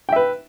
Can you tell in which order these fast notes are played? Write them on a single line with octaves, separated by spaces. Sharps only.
G5 E5 B4